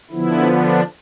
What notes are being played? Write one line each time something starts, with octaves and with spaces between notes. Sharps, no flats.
D3 F3 B3 E4
D4